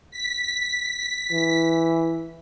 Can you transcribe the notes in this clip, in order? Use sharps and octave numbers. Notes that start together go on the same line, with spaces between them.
B6
E3